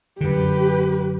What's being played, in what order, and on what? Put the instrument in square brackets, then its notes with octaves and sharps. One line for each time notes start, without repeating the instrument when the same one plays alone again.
[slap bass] F#2 D3 [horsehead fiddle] G4 B4